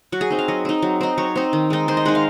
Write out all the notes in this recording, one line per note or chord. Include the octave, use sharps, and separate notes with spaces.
F#3 F#4
G#4
C4 D#4
F5
F#3 D#5
C4 D#4
F#3
C4 D#4
F#3 C#5
C4 D#4
D#3
G#3 D#4
D#3 C5
D#5
G#3 D#4 F#5
F5